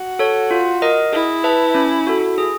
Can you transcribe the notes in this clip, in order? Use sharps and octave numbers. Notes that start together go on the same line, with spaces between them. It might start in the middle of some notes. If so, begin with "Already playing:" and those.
Already playing: F#4
A4 C#5
F4
A#4 D#5
E4 G#4
B4 E5 A5
C#4
F#4 A4
G#4